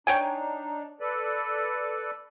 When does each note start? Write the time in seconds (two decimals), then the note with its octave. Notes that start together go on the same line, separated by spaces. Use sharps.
0.07 D4 D#4 C#5 G5 G#5
1.00 A4 B4 D5